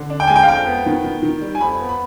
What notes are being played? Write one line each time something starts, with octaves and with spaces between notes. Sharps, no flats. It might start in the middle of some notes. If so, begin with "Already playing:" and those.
Already playing: D3
D4
G5
G#3 G#5
G5
F5
F2 G5
B3
D#3
D#3
D#3
G3
G#5
F2 B5
B3
B5